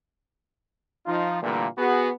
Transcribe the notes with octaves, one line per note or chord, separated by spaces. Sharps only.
F3 D#4 F4
A#2 D3 E3 G3 A3 A#3
B3 F#4 G#4